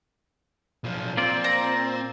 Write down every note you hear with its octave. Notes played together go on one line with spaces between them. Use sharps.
B1 F3
A#2 C4 F4 D5
A#5